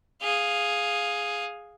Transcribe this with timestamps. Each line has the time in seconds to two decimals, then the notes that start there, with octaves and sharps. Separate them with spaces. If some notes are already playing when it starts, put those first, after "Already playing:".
0.22 G#4 F5